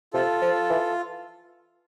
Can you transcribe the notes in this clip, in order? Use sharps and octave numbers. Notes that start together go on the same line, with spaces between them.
C3 F4 A4
F3
E3